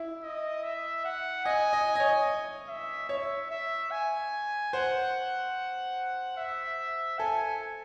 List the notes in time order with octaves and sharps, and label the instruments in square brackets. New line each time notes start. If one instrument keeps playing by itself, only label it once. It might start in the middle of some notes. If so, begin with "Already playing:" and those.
Already playing: [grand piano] E4
[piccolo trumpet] D#5
E5
F#5
[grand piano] D#5 [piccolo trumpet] G#5
[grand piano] D#5
D#5
C#5
[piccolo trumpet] E5
[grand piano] C#5 [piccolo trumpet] E5
[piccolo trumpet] E5
G#5
[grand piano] C5 [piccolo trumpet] F#5
[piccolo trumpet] E5
[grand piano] A4 [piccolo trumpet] G#5